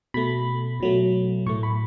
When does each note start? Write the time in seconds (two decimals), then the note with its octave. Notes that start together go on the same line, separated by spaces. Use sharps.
0.14 B2 A3 B5
0.80 B2 F#3 A3
1.46 A2 C#6
1.49 A3
1.63 B5